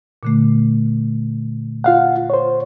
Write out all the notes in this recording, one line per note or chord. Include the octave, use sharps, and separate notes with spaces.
A#2 D3 A3
F4 F5 F#5
C5 C#5